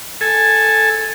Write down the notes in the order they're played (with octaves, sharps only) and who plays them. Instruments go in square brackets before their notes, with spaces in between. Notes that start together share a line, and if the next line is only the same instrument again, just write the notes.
[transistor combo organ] A4 G#5